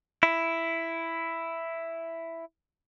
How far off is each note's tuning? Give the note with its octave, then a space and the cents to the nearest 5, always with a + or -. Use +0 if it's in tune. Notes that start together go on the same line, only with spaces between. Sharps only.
E4 +5